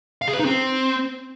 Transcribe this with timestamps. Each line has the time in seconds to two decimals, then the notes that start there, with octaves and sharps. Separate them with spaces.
0.22 F5
0.28 G#4
0.33 B4
0.39 D#4
0.45 C4